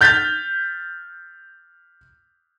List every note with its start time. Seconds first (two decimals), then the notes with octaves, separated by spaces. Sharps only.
0.01 F6 G6 A6 B6